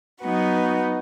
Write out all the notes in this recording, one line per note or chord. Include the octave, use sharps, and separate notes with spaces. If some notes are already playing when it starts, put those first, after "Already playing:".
F#3 B3 D#4 F#4 B4